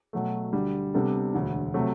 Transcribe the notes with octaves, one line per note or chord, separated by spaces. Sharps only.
B2 F#3 A3
D2 D3 G3
C3 G3 B3 D4 A4
E1 D2 D3
C3 F#3 A3